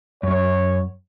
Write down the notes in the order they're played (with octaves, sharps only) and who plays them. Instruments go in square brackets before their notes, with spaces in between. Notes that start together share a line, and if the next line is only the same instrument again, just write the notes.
[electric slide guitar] F#2 [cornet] C#5